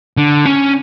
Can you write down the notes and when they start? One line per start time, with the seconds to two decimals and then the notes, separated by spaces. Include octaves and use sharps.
0.17 D3
0.46 C#4